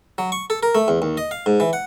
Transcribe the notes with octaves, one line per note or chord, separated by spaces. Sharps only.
F#3
C#6
A4
A#4
A3
E2
D#2
D#5
F5
G#2
E3
F#5